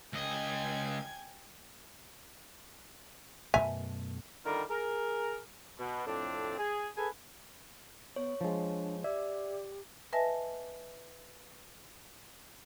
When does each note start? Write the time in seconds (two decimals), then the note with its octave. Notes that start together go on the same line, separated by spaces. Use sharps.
0.13 C#2 D#5 G5 G#5 G#6
3.54 F#2 B2 A3 E5 G#5
4.45 D3 D#3 G3 F4 A#4
4.70 G#4 A#4
5.79 B2
6.07 F2 A2 C4 D4
6.58 G#4
6.97 G#4 A4 B4 G#5
8.16 B3 C#5
8.41 F3 G#3 D4
9.04 G4 D5 E5
10.13 B4 D#5 E5 G#5 A5 A#6